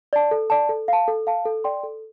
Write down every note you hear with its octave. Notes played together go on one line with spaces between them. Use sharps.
D5 A5
A4
D5 A5
A4
F5 A5
A4
F5 A5
A4
D5 G5 C6
A4